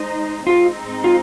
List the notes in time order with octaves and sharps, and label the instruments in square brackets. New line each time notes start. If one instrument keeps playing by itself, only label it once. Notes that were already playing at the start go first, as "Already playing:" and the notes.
Already playing: [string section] G#3 D#4 C5 D#5
[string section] G#2 G#3 C4 D#4 [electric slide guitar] F4
[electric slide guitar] F4